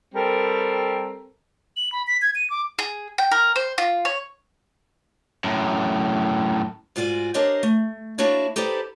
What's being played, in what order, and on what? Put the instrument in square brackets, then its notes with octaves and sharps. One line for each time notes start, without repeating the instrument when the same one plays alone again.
[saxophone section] G3 C4 A4 A#4
[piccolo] F#7
B5
B6
G#6
D#7
D6
[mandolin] G#4
G5
A#4
C5
F4
C#5
[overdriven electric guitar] F#2 A2
[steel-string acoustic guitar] G#2 F4 F#4 D5 G#5
D4 G4 A#4 C5 C#5 D#5
A3
A#3 D4 E4 F#4 C#5 D5
D#4 G4 A4 B4 C5 D5